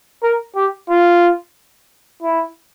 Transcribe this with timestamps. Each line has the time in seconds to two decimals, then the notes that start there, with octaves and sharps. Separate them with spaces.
0.23 A#4
0.56 G4
0.89 F4
2.22 E4